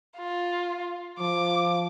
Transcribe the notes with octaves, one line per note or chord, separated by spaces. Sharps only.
F4
F3 D6